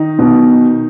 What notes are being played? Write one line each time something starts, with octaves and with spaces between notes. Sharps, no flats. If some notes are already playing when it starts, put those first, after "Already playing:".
Already playing: D#3 D#4
B2